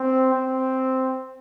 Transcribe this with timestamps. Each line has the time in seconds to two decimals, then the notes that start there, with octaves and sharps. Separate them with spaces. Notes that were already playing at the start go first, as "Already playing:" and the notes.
Already playing: C4
0.33 C4